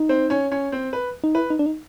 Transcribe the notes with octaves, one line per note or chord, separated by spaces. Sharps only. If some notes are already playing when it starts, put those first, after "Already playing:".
Already playing: D#4
C4 C5
C#4 C#5
C#4 C#5
C4 C5
B4
D#4
E4 B4
D#4
D4
D#4